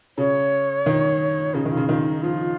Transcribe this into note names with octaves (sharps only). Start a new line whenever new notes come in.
C#3 C#5
D#3
C#3 D#4
D#3
F4
C#3
D#3 F4
D#4
F3 F4